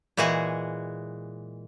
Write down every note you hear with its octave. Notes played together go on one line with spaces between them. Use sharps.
A#2 E3 G#3 F#4 G#4 F#5